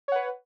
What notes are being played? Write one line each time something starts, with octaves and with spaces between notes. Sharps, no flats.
B4 C#5 F#5